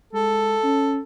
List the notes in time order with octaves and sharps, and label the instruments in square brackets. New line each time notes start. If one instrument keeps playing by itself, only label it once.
[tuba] G#3 [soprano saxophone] A4
[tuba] C#4